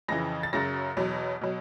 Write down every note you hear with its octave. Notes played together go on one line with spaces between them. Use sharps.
F2 C#3 E3 A#6
A6
F#2 C#3 F#3 A#6
E2 B2 F#3
B2 F#3